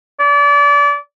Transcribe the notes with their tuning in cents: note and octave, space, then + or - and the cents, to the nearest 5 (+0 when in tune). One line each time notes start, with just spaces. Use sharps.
D5 -30